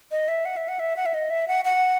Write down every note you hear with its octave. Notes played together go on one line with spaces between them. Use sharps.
D#5
E5
F#5
E5
F#5
E5
F#5
E5
D#5
E5
F#5
F#5